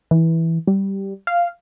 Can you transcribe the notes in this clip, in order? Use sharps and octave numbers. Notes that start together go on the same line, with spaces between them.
E3
G3
F5